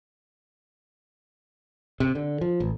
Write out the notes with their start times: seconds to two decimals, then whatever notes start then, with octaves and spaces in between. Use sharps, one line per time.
2.00 C3
2.15 D3
2.41 F3
2.60 A1